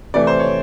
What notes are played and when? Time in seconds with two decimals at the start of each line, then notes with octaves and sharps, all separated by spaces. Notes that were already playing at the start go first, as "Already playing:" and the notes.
0.14 C3 E3 A3 D5
0.27 C5
0.40 C#5